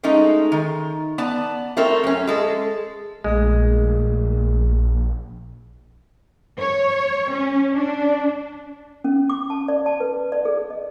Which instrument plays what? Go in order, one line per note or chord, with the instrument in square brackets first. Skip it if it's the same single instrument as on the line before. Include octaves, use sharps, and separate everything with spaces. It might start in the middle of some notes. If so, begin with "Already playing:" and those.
[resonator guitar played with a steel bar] G#3 A3 C#4 D#4
D#3
B3 D5 A5
A3 C4 A#4 C#5 E5
F#2 C#4
G#3 A4
[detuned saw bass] A#1 [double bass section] A#2 [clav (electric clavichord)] G#3 [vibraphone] A3 G#4
[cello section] C#5
C#4
D4
[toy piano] C#4
D6
A5
D5
A5
B4
D5
G#4
D#5